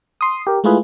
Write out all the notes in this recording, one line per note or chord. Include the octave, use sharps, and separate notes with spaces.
C6 D#6
G4 A#4
G#3 A3 E4 F4 G#4 B4